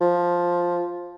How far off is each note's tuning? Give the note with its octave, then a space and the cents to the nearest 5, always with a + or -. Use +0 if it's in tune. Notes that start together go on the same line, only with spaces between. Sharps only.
F3 +5